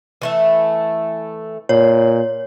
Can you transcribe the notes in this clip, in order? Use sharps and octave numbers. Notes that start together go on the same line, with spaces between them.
E3 A3 E5
A#2 C#5